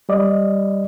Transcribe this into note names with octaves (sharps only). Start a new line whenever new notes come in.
G3 D5 D#5